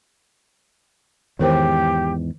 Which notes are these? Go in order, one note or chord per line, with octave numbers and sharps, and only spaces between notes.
E2 G#2 D#3 G4 A#4 C5